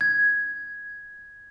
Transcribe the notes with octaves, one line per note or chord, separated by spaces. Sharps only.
G#6